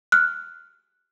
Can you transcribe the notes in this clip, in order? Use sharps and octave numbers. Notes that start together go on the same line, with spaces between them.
F6 F#6